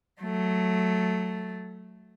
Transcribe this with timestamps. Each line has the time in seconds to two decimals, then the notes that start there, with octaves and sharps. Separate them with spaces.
0.21 F#3 A3